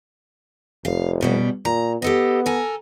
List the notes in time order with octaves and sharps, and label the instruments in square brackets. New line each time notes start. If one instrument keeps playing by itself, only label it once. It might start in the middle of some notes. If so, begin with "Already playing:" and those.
[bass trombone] F1 [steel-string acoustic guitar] F5
[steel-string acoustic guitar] F#2 B2 G3
[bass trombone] A#2 [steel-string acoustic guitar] A#5
[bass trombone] B3 [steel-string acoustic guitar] G4 A4 D#5
[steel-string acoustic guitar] A4 A#4 G#5